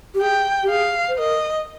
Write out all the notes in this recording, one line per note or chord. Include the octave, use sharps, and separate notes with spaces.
G4
G#4 G5
G4
G#4 F5
C5
A#4 D#5